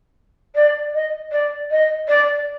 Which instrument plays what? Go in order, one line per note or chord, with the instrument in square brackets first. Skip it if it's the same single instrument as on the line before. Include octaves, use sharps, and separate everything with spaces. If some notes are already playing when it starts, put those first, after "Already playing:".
[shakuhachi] D5
D#5
D5
D#5
D5